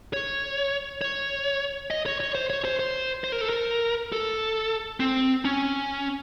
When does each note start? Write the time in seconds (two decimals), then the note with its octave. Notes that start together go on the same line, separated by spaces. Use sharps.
0.13 C#5
1.02 C#5
1.91 D#5
2.06 C#5
2.20 C#5
2.35 C5
2.50 C#5
2.65 C5
2.79 C5
3.24 C5
3.32 A#4
3.41 A4
3.49 A#4
4.12 A4
5.00 C4
5.45 C#4